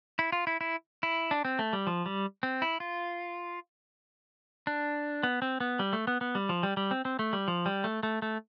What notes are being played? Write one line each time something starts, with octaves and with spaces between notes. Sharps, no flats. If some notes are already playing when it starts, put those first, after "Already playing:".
E4
F4
E4
E4
E4
D4
C4
A3
G3
F3
G3
C4
E4
F4
D4
B3
C4
B3
G3
A3
B3
B3
G3
F3
G3
G3
C4
C4
A3
G3
F3
G3
A3
A3
A3